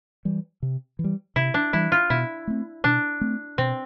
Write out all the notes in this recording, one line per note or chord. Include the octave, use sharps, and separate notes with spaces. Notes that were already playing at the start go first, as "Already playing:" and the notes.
E3 G3
C3
E3
G3
C3 E4
D4
E3 G3 E4
F4
B2 E4
A3 C4
B2 D4
A3 C4
B2 C4